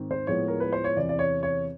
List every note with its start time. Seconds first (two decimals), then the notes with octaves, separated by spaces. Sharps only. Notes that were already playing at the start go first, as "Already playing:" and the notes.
Already playing: G#2 D#3 C4
0.11 C5
0.27 A2 F3 G#3 B3 C#5
0.48 A#4
0.60 B4
0.73 C5
0.84 C#5
0.96 E2 C3 E3 D5
1.09 D5
1.19 C#5
1.43 C#5